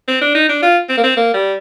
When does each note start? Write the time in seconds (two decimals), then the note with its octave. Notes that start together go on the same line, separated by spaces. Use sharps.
0.08 C4
0.21 D4
0.34 D#4
0.49 D4
0.62 F4
0.89 C4
0.97 A#3
1.03 C4
1.17 A#3
1.34 G3